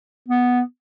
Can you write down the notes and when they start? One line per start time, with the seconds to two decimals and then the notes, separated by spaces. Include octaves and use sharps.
0.28 B3